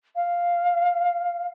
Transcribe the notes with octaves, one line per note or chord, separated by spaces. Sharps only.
F5